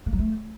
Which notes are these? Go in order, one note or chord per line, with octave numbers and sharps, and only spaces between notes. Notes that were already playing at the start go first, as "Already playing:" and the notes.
A#3
F#3
A3